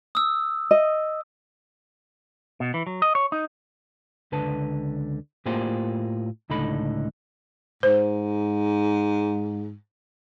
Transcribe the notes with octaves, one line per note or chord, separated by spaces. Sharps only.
D#6 E6
D#5
B2
E3
F#3
D#5
C#5
D#4
C#2 D3 B4 A5
A2 A#3 F4 G4 G#4 C5
C#2 A2 D3 D#4 A4 B5
G#2 C5